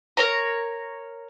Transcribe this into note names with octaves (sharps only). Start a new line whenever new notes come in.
A#4 C#5 A#5